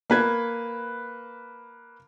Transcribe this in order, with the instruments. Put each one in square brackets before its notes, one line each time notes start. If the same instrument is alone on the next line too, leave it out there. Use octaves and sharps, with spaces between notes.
[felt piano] A#3 B4 G#6